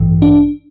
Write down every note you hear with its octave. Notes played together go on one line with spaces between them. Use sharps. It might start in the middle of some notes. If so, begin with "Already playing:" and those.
Already playing: A1 G2 E3
D4